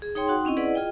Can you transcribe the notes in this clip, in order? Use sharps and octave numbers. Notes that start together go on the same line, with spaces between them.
G#4
D#4 G#4 C#5 G5 C6
D#4 F#4 F#5 G5 C6
C4 C#4 E4 D#5
E4 G#4 B4 D5 D#5 F#5
F4 G#4 D#5 G5